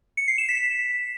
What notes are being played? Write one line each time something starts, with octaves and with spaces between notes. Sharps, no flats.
C#7
C7
E7
B6